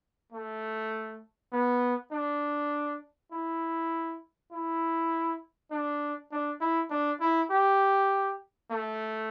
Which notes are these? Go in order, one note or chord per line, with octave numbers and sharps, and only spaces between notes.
A3
B3
D4
E4
E4
D4
D4
E4
D4
E4
G4
A3